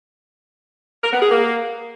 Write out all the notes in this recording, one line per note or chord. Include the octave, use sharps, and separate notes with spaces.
A#4
B3
G#4
A#3